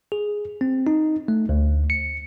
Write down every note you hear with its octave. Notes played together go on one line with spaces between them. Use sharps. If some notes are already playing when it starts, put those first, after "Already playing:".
G#4
C4
D#4
A3
D2
C#7